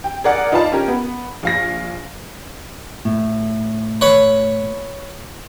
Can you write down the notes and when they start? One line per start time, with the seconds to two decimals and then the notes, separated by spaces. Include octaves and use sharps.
0.04 G5
0.24 G#4 A#4 D5 F#5
0.52 D#4 F4 B4 D5 F5 A5
0.72 C#4 G4 A#4
0.88 B3
1.43 A#1 F5 A#6
3.05 A2
4.01 B4 C#5 B5